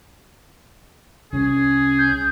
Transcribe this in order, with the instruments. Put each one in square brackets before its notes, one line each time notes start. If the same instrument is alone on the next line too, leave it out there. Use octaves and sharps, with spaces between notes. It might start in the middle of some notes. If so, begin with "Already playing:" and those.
[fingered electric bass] C2 [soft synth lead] C#4 [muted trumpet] G#4
[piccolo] G6